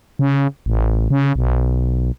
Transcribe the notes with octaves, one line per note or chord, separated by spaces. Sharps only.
C#3
A1
C#3
B1